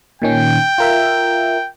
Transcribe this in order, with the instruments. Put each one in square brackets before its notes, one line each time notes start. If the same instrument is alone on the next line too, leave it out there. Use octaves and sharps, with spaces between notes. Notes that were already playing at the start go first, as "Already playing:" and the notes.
[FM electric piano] A#2 D#3 C#4 [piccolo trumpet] G5
[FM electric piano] F4 A#4 E5